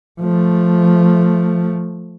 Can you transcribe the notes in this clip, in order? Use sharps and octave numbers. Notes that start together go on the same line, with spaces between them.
F3 A3